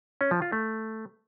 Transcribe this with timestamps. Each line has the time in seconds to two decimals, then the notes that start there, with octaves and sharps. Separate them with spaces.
0.21 C#4
0.31 F3
0.42 F4
0.52 A3